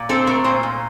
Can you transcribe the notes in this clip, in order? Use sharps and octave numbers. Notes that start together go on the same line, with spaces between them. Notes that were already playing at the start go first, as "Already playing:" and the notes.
Already playing: A#2
C4 A4
A3 A#4
A#2 C5
A#2